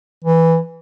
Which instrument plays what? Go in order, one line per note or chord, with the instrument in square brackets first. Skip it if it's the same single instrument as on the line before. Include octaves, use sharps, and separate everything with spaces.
[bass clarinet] E3